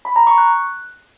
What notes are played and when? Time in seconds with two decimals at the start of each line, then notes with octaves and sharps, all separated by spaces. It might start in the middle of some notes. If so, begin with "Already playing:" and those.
0.05 B5
0.16 A#5
0.27 C#6
0.38 F#6